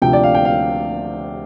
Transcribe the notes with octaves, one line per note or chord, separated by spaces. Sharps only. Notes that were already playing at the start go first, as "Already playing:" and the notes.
D2 C3 F3 G5
D5
F5
G5
F5